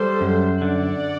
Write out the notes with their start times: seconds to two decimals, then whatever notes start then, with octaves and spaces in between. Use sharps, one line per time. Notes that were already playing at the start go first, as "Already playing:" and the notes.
Already playing: G3 A4 C5
0.21 F#2
0.61 D3 D5 F#5